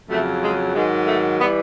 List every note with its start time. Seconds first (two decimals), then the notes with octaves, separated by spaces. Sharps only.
0.10 F2 C#3 F#3 A3
0.43 G#3
0.75 G#2 D#3 F#3 G#3
1.07 A3
1.40 E3 G3 B3